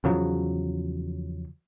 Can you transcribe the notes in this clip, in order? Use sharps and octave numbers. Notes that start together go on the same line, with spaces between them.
E2 C#3 F3 F#3